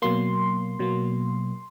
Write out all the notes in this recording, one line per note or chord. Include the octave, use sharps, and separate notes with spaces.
B2 F#3 A#3 C6
B2 F#3 A#3